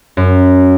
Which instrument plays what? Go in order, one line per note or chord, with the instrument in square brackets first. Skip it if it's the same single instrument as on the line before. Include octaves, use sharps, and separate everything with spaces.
[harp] F#2